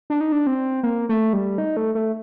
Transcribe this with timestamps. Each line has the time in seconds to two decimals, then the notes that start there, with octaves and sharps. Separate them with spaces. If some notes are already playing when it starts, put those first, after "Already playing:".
0.10 D4
0.21 D#4
0.32 D4
0.47 C4
0.83 A#3
1.09 A3
1.33 G3
1.58 D#4
1.77 A3
1.95 A3